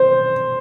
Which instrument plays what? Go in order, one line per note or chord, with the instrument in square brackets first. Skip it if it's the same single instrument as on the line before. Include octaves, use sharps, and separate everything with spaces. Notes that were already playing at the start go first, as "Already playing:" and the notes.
Already playing: [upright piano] C5